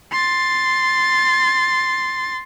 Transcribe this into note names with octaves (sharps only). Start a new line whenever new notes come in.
C6 A6